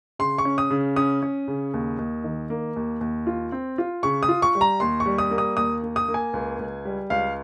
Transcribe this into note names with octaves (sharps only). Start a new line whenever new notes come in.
C#3 C6
C#6
C#4
D#6
C#3
C#4 D#6
C#4
C#3
D#2
D#2
D#3
A#3
D#2
D#2
F4
C4
F4
C#3 C#6
D#6
F4
C#6
G3
A#5
D#2 C6
C#6
G3
D#6
A#3
D#6
D#2 D#6
A#3
D#6
A#3
G#5
C#2
C#2
G3
C#2 F5